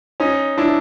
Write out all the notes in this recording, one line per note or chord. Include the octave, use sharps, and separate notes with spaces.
C#4 D#4
D4 E4